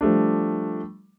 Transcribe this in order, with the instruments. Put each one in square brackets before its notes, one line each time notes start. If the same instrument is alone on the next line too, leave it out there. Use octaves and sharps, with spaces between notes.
[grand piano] F3 G3 A3 D4